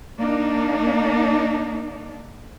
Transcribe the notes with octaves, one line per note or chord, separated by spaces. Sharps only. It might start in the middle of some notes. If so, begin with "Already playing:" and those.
A#3 D4 D#4